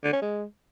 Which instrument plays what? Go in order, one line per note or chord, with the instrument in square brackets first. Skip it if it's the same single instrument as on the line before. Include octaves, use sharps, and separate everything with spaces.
[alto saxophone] D3
C#4
G#3